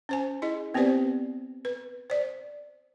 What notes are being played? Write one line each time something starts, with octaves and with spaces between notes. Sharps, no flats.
C#4 C5 G#5
E4 G#4 D#5
B3 C4 G4 B4 C5 D5
B4
C5 D5